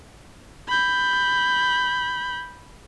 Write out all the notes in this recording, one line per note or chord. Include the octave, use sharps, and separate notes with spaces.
B5 G6